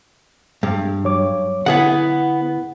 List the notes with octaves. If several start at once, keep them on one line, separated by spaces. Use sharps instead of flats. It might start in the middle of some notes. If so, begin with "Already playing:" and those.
G2
F#3 C#5 D6
D3 B3 E4 G#4 F#5